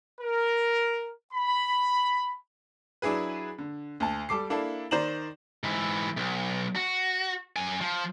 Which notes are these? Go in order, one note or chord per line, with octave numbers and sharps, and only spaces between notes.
A#4
B5
F#3 D4 E4 G#4 B4
D3
D2 A5
G3 A4 D6 C7
A#3 D4 E4 A4
D#3 C5 D5 A#5 E7 F#7
G#2 E3
B1
F#4
F#2 G#5
F3